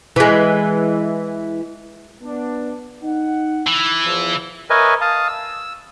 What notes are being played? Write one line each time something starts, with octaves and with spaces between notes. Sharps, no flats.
E3 G#3
B3 D4
D#4 F#5
E3
E2 F3
A#4 B4 C#5 D#5 E5 G#5
F5 A5 D#6
E6